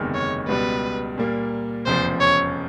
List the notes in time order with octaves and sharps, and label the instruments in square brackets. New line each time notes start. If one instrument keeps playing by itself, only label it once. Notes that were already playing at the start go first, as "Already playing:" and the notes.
Already playing: [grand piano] F#1 E2 C3 D#3 G#3
[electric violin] C#5
[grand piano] C#2 B2 G3 [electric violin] B4
[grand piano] A#2 G3 A#3
[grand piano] F1 E2 C#3 F3 [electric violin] C5
[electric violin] C#5